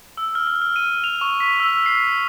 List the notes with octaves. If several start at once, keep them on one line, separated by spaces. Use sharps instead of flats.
E6
F6
F6
F6
D#7
F7
C#6
B6
E6
C7